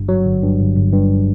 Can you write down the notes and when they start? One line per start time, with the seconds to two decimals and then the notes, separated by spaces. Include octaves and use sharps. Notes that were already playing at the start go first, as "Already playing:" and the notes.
Already playing: G1 G2
0.09 F#3
0.26 G1
0.43 G2
0.59 G1
0.76 G1
0.93 G2